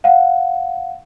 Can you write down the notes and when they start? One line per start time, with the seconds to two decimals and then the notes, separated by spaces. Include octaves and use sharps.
0.04 F5 F#5